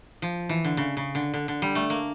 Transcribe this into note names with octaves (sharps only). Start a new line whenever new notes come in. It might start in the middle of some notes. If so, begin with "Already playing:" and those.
F3
E3
D3
C#3
C#3
D3
D3
D3
G3
A3
A#3